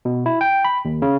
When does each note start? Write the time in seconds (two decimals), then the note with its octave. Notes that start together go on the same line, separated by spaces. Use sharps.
0.05 B2
0.26 E4
0.41 G5
0.65 B5
0.85 D#2
1.02 C#3